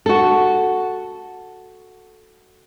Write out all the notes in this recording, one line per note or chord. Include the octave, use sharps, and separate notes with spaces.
F#4 A4